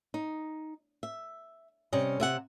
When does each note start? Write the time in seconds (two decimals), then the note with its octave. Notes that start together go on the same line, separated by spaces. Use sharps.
0.14 D#4
1.03 E5
1.93 C3 G3 C#4 D#5
2.20 C3 E5 F#5